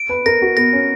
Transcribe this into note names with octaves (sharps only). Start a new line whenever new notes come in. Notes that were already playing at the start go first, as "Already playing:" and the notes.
Already playing: D7
B4
A#4 A#6
F#4
B3 A#6
C#4